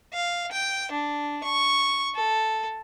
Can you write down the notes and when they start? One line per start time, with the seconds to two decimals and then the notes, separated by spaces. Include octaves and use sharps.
0.13 F5
0.52 G5
0.92 D4
1.44 C#6
2.15 A4